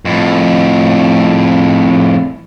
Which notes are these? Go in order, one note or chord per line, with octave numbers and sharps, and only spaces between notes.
F2 A2